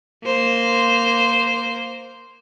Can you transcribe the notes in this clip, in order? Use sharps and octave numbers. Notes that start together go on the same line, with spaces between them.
A#3 C5